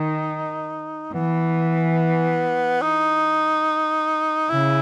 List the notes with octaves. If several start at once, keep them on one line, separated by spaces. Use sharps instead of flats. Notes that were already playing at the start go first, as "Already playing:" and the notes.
Already playing: D#3 D#4
E3 B3
D#4
C#3 E4